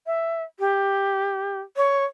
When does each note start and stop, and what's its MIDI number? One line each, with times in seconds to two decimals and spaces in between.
0.07 0.43 76
0.60 1.59 67
1.77 2.04 73